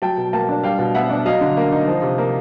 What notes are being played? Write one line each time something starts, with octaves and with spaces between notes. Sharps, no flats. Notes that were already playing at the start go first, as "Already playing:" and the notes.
F#3 G5 A5
B2
A#3 G5 A5
D4
G3 F5 G5
B2
B3 E5 F#5
D4
F#3 D#5 F5
D3
A#3
D#4
F3
C3
A#3